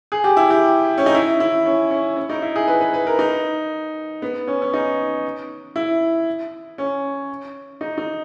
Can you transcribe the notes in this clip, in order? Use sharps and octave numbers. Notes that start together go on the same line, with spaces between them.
G#4
G4
E4
G4
C#4
D#4
E4
E4
C#4
C#4
C#4
D#4
E4
G#4
B4
B4
B4
A#4
D#4
B3
C#4
C#4
D#4
E4
C#4
D#4
D#4